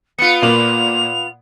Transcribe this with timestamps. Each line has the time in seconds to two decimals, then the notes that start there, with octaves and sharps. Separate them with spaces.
0.18 B3 F4 C#7
0.42 A#2 A#3 F7 F#7